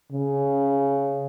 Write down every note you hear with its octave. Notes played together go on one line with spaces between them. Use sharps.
C#3